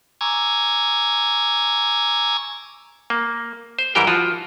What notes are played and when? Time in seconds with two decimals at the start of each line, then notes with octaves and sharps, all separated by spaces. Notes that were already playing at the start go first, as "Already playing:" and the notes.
0.21 G#5 A#5 C#6 D6 E6 G#6
3.10 A#3
3.79 C5
3.95 G#2 E3 G3 G4 A#4 G5
4.07 F3 F4 F#4